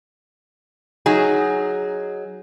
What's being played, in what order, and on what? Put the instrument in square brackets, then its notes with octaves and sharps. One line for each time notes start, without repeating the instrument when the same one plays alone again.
[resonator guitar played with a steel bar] F#3 D#4 G#4